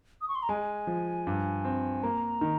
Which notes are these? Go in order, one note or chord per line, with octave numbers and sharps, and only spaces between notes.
D#6
C#6
C6
A#5
G#3 G#5
F3
G2
C4
A#3 A#5
D#3